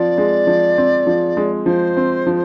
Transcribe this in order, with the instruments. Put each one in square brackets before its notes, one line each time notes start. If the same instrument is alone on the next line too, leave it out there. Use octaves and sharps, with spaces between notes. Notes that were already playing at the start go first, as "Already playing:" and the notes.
Already playing: [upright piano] F3 C4 [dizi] D5
[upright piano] G#3
F3
C4
F3
G#3
[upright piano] F3 [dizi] C5
[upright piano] C4
F3